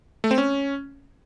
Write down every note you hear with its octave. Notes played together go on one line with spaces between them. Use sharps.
A3
C4
C#4